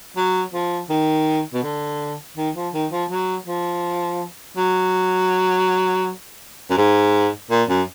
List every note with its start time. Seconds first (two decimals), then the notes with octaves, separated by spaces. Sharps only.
0.17 F#3
0.54 F3
0.90 D#3
1.53 B2
1.63 D3
2.37 D#3
2.56 F3
2.74 D#3
2.91 F3
3.10 F#3
3.46 F3
4.57 F#3
6.70 F#2
6.78 G#2
7.50 A#2
7.69 F#2